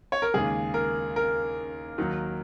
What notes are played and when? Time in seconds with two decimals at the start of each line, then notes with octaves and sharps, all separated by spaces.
0.12 C#5
0.22 A#4
0.34 D#2 C#3 G#3 G#4
0.74 A#4
1.16 A#4
1.98 D#2 D#3 F#3